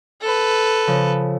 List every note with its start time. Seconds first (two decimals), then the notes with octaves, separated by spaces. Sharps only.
0.21 A4 B4
0.87 C#3 F3